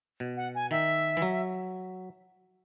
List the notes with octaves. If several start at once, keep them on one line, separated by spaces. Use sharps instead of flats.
B2
F#5
G#5
D#3 E5
E3
F#3